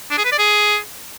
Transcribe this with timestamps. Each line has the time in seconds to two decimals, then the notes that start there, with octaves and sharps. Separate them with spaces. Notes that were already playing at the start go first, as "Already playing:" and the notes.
0.11 D4
0.18 G#4
0.25 B4
0.32 D5
0.39 G#4